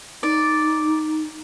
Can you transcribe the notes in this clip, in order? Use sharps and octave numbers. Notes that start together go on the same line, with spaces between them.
D#4 D5